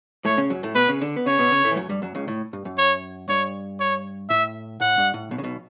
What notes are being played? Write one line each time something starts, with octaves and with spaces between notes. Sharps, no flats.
A2 A3 C#5
C#3 C#4
F#2 F#3
A2 A3
B2 B3 B4
C#3 C#4
D3 D4
B3
C#3 C#4 C#5
B2 B3
C#3 C#4
A2 A3
E3
F#2 F#3
G2 G3
F#2 F#3
C#2 C#3
A2
G2
F#2
C#5
G2 C#5
C#5
A2 E5
A2 F#5
G2
A2
B1 B2
C#3
B1 B2